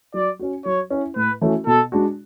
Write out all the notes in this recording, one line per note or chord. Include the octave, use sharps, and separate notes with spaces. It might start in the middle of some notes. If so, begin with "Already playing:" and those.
F#3 D5
C#4 F#4
F#3 C#5
C#4 E4
A2 B4
E3 A3 C#4 F#4
B2 A4
G#3 D4 F#4